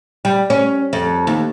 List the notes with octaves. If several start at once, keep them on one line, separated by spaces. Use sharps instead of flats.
G3
C#4
F2
D#2